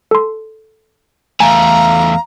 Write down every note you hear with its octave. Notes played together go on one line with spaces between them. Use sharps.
A4 C6
E2 A3 F5 G#5 A#5